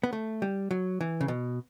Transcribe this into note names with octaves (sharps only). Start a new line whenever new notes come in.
B3
A3
G3
F#3
E3
C#3
B2